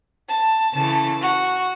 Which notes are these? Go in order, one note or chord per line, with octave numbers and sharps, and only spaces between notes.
A5
C#3 E3 A3 A5
F#4